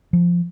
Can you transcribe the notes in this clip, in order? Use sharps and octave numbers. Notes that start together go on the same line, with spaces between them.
F3